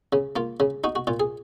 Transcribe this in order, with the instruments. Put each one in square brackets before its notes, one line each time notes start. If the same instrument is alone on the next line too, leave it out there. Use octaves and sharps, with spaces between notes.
[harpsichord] C#3
A#3 F4
C#3
D#4 F#4
F#4
A#2 F4
G#4